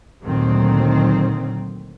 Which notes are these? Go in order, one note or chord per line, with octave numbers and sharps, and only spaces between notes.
D2 A#2 D#3 F#3 C4